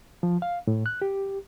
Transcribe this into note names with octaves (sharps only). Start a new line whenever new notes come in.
F3
F5
A2
F#6
G4